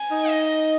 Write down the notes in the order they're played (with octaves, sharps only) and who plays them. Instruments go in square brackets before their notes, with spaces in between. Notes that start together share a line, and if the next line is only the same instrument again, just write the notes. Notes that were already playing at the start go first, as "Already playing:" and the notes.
Already playing: [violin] G#5
[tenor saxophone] D#4
[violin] D#5